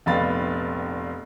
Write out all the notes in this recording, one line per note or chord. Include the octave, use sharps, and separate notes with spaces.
F1 A#1 B3 F5 B5 A6